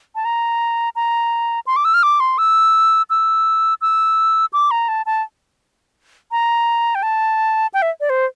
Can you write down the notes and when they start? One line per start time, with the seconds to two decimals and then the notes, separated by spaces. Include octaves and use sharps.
0.15 A5
0.25 A#5
0.96 A#5
1.67 C6
1.76 D6
1.85 E6
1.94 F6
2.03 D6
2.20 C6
2.38 E6
3.10 E6
3.81 E6
4.53 D6
4.71 A#5
4.88 A5
5.06 A5
6.31 A#5
6.95 G5
7.03 A5
7.74 G5
7.82 E5
8.00 D5
8.10 C5